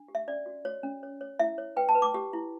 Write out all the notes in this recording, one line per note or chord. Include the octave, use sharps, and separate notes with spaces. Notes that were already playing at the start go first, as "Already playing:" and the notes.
Already playing: D4
G4
E5
C#4 D5
F#4
F#4 C#5
C#4
C#5
C#5
E4 E5
C#5
B4 G5
A5
B4
D6
G4
E4